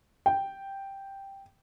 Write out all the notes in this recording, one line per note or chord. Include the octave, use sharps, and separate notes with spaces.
G5